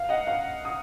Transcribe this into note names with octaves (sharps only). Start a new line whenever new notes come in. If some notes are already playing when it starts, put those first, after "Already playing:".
Already playing: F5
D#5 F#5
F5
D#6